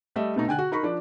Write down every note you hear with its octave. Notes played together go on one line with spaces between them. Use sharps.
G3 A3 D#5 E5
B2 A3 D#4
D3 G5 G#5 F#6
F#4
D#4 A#4 B5 C#6
F3 D4